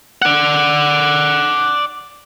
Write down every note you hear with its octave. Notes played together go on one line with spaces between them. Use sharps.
D5 F#5